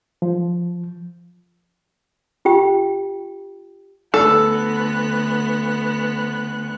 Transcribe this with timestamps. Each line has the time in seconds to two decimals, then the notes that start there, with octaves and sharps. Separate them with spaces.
0.22 F3
2.45 F4 G4 G5
4.14 D2 B3 A4 F#6